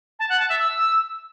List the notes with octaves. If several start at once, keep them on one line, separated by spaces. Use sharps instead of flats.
A5
F#5
A5
E5
E6